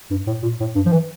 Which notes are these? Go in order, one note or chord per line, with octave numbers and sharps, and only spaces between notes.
G2
A2
A#2
A2
G2
F3
E3